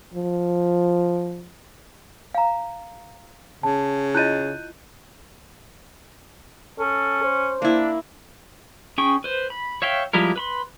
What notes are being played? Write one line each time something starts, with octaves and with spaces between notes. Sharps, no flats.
F3
F5 A#5
C#3 A5
E4 F4 D#5 F#6 G6 D#7
C#4 A4
C5
A#3 D4 E4
C#4 G#4 G5 C#6
B4 C5
B5
C#5 E5 F5 G5
F3 G3 G#3 E4 A#4
B4 B5 C6